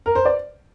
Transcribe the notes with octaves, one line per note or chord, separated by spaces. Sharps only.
A#4
C5
D5